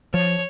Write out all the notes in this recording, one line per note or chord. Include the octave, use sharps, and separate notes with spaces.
F3 C#5